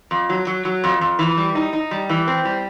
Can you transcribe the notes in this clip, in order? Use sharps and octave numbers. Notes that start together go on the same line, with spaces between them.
F2
F#3
F#3
F#3
F2
F2
E3
G3
D#4
D#4
G3
E3
C4
G3